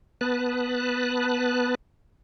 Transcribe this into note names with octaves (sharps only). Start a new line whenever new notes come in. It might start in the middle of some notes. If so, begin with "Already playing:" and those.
B3 B4 A5 F#6